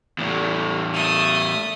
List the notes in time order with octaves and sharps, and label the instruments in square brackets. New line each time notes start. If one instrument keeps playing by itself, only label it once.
[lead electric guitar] E2 A2
[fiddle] A3 D#6